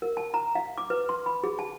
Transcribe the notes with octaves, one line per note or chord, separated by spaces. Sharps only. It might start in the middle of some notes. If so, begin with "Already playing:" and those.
A#4
A5
A#5
F5
D6
B4
C6
B5
G#4
A5